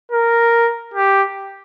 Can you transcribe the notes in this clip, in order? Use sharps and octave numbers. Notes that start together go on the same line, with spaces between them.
A#4
G4